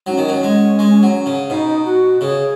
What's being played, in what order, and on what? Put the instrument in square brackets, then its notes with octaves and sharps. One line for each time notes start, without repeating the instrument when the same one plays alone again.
[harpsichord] F#3 [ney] D#4
[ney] C#4
[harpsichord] D#3
F#3
G#3
G#3
F#3
C#3
[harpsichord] B2 [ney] D#4
[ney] F#4
[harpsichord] C#3 [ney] G#4